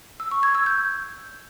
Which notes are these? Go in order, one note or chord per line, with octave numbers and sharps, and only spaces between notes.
E6
C#6
G#6
E6
G6